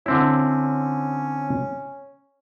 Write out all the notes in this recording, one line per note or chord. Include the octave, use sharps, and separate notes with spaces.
D3 C4 C#4 E4